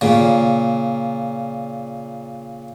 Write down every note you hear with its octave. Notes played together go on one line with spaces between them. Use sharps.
A#2 C#3